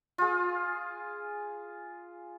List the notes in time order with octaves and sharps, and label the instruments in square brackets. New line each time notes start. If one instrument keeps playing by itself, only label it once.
[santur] F4 G#4